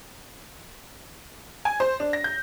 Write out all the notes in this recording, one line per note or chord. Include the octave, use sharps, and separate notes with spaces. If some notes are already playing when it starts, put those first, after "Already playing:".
G#5
C5
D4
A#6
G6